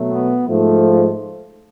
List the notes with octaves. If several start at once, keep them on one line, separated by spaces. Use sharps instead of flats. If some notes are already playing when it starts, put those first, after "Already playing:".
Already playing: B2 F#3 A3
B3
G#2 F3 A3